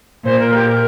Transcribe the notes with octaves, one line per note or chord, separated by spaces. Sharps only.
A#2 C5
A#4
G4
A#4